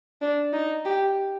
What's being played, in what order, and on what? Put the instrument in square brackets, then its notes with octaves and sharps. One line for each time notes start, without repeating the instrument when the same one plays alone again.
[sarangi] D4
D#4
G4